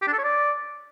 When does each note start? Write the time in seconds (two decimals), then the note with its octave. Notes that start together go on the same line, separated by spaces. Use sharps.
0.02 G4
0.07 D4
0.13 A4
0.18 C#5
0.24 D5